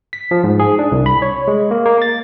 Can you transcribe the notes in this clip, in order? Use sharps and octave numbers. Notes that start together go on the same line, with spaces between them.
B6
F3
G#2
G#4
D4
C2
B5
C#5
G#3
A#3
A#3
A6